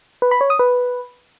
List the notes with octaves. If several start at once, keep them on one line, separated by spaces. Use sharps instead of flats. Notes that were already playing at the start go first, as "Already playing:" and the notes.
B4
B5
C#5
D#6
B4